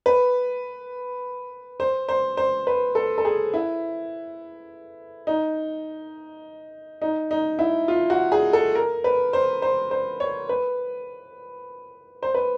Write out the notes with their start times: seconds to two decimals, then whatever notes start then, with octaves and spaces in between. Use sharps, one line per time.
0.06 B4
1.80 C5
2.09 C5
2.37 C5
2.67 B4
2.95 A4
3.18 A4
3.25 G#4
3.54 E4
5.27 D#4
7.02 D#4
7.31 D#4
7.59 E4
7.88 F4
8.10 F#4
8.32 G#4
8.53 A4
8.75 A#4
9.04 B4
9.33 C5
9.62 C5
9.91 C5
10.20 C#5
10.49 B4
12.23 C5
12.34 B4